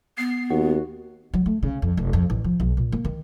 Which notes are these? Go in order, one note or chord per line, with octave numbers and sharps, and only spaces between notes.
B3 C7
D#2 F#4
F#3
A3
C#3
F2
F1
F2
A1
F3
B1
A#2
A#3
D#3